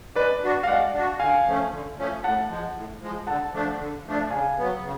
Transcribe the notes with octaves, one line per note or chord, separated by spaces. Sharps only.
G#3 B4 D5
D4 F#4
F5
G#3 D5 F#5
D4 F#4
D3 F5 G#5
F3 A3 C#4
D3
F3 A3 C#4
A2 F#5 A5
F3 G#3
A2
F3 G#3
D3 F#5 A5
F3 A3 D4
D3
F3 A3 D4
C#3 F5 G#5
F#3 B3
C#3